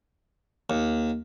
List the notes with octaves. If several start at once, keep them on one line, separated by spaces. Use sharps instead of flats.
D#2 A#3